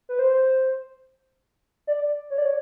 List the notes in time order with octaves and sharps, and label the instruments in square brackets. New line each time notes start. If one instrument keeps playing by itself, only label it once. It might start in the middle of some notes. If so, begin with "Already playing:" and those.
[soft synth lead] B4
C5
D5
C#5
D5
C#5